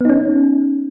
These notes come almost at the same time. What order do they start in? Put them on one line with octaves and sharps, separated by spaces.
B3 D#4 C#4